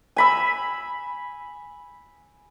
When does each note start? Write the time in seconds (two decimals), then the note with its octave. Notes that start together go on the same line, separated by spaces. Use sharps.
0.16 G#5 B5 E6